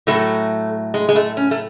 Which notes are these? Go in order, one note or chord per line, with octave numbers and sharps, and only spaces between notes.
A2 F#3 A3
G#3
G#3
A3
C#4
A3